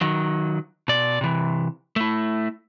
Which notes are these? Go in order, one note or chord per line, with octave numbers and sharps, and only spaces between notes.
D#3 F#3
B2 D5
C3 E3
A3 E4